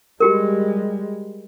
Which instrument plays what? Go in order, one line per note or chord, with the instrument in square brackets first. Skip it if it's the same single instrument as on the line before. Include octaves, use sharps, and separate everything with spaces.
[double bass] G3 G#3 [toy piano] F#4 G4 A#4